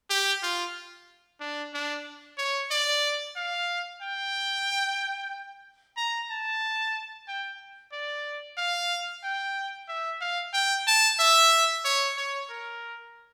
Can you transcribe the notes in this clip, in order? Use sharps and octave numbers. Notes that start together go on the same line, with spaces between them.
G4
F4
D4
D4
C#5
D5
F5
G5
A#5
A5
G5
D5
F5
G5
E5
F5
G5
A5
E5
C#5
C#5
A#4